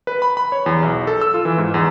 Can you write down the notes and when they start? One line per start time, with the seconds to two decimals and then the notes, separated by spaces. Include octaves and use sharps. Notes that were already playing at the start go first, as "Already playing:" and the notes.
0.07 B4
0.22 B5
0.37 B5
0.52 C#5
0.66 E2
0.83 B1
1.07 A4
1.21 E6
1.34 F4
1.45 E3
1.58 G#2
1.74 E2